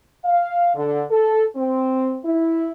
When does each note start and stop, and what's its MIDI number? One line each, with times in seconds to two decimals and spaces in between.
0.25 0.70 77
0.76 1.04 50
1.11 1.44 69
1.56 2.18 60
2.25 2.70 64